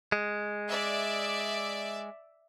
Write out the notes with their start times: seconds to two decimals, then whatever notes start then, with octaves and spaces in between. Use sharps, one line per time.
0.12 G#3
0.68 D5 E5